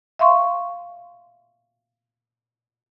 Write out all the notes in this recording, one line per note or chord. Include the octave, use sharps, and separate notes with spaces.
E5 F5 C6 C#6